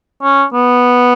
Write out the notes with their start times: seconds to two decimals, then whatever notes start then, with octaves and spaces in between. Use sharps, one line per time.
0.23 C#4
0.53 B3